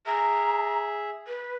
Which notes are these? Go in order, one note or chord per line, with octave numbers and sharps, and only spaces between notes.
G#4 E5 A#5
B4